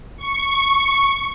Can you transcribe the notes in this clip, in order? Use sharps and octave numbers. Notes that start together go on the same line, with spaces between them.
C#6